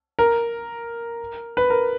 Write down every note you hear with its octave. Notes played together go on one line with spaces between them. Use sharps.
A#4
B4
A#4